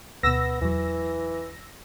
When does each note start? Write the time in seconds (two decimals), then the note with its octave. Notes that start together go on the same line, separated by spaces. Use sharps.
0.23 D2 B2 B3 E6 A#6
0.62 E2 E3 F#3